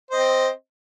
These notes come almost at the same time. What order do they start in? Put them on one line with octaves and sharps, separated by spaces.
C5 D#5 C4